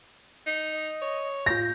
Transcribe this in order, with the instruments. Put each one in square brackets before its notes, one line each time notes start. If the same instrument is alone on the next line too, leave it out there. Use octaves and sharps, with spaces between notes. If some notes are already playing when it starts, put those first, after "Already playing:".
[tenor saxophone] D#4
[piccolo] D#5
[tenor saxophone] C#5
[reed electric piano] A2 F4 [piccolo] G6 [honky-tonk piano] A#6